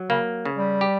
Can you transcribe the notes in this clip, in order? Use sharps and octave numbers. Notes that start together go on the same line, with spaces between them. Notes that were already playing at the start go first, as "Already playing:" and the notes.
Already playing: F#3
C#3 A#3
C#3
G3
G4